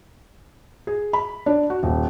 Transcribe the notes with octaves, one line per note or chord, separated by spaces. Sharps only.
G#4
B5
D4
F#4
D#1